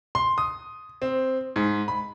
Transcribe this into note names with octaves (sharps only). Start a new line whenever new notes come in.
C6
D#6
C4
G#2
B5